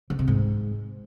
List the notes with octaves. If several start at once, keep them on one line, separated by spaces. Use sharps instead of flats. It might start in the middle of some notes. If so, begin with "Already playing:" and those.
D3
C3
G#2